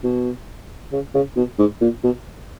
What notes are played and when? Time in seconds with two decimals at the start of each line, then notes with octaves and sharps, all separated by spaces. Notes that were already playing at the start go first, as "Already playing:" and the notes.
0.04 B2
0.93 C#3
1.15 C#3
1.37 B2
1.59 G#2
1.81 A#2
2.04 B2